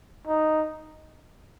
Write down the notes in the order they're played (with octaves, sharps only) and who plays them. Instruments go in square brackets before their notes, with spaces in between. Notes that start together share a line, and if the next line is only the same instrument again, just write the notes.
[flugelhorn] D#4